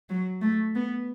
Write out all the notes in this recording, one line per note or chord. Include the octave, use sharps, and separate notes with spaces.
F#3
A3
B3